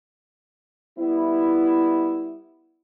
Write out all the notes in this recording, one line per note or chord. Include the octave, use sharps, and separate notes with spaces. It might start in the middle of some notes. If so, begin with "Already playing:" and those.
G3 B3 E4